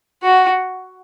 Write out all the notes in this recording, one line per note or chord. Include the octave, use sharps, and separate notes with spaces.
F#4